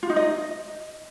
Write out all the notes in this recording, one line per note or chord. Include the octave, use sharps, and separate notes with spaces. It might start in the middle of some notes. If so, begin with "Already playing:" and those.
F4
D#4
D#5